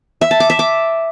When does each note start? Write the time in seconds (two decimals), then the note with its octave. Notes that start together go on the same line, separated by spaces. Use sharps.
0.21 E5
0.31 A5
0.40 D6
0.50 E5
0.59 D6